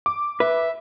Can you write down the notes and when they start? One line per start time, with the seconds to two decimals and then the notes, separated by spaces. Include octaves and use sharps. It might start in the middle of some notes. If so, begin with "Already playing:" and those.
0.06 D6
0.40 B4 E5